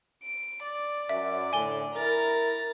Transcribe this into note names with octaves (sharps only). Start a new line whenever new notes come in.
D7
D5
F#2 E5
A2 D3 G#5 G7
E4 A#4 A#5 A6